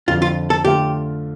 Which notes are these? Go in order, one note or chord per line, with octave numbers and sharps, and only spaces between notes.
F2 D3 F3 F4
F4
A4
D3 A3 F4 G4